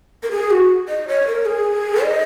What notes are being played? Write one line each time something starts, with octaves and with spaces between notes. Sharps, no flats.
A#4
G#4
F#4
D#5
C#5
A#4
G#4
D#5